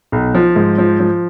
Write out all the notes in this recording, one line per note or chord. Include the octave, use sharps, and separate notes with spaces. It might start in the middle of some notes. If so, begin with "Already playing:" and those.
B1
F3
G#2
F3
F3